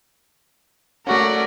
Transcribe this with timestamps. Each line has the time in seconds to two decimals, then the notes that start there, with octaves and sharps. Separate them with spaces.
1.07 A3 C#4 F#4 A#4 D5